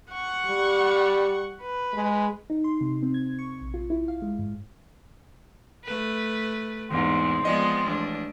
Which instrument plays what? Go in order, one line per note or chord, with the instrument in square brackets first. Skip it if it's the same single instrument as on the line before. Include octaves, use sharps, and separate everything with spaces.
[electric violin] F#5 C#6
[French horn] G3
[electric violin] B4
[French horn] G#3
[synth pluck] D#4
C6
C3
C4
G#6
C#6
A#1
F4
E4
F5
G#3
G#2
[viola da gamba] A3 B4
[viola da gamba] E2 G#2 [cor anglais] C4
[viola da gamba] F3 G#3 B3 [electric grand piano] F4 D5 D#5
[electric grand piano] A1 [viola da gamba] D4